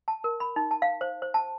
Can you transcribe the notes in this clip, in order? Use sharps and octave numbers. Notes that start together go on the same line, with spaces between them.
A5
A#4
B5
D#4
A5
F5
C5
C5
A5